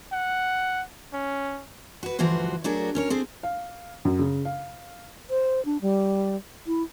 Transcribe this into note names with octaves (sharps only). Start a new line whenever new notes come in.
F#5
C#4
F#4 B4
D2 G2 E3 F3 F#4 C5
F#3 A3 D4 F#4 G#4 A#4
C#4 A#4 C#5
C4 G#4 A4 C5
F5
F#2
C#3
F5
C5
D4
G3
E4